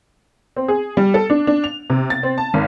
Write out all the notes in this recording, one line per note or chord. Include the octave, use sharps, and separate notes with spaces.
C4
G#4
G3
A4
D4
D4
F7
C3
A6
C4
A5
G#1